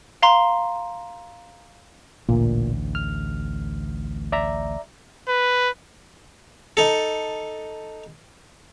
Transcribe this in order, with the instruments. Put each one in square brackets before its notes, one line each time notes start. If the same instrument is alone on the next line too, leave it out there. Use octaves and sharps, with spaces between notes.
[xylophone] F5 A#5 C6
[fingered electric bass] A1 D2 [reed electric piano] A#2
[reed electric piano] F6
D5 E5 A#5
[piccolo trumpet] B4
[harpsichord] D#4 A4